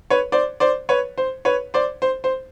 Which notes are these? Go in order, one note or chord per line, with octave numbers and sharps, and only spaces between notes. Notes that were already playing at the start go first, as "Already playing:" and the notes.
B4 C#5
C5 D5
C5 D5
B4 C#5
C5
B4 C#5
C5 D5
C5
C5